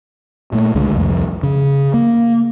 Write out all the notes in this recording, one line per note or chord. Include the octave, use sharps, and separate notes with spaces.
A#2 A3
C#2 D3 G#3
C2 F2
C#3
A#3